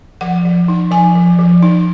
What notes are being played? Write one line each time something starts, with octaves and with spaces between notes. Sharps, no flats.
F3 F#5
F3
D#4
F3 G#5
F3
F3
D#4